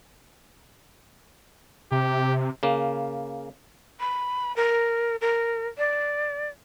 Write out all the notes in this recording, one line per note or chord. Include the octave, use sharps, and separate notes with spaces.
C3 G4
C#3 A#3
B5
A#4
A#4
D5